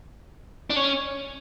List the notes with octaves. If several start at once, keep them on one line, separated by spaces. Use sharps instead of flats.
D4
C#4